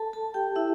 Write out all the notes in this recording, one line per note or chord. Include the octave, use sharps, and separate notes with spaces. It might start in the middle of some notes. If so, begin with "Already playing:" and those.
Already playing: A4 A5
A4 A5
G4 G5
E4 E5